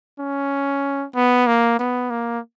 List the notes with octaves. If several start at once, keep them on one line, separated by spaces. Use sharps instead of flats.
C#4
B3
A#3
B3
A#3